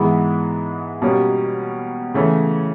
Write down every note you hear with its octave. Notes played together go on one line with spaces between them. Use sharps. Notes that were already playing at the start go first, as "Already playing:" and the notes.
Already playing: G#2 E3 G#3 B3 E4
B2 G3 A#3 C#4
C#3 E3 A3 C#4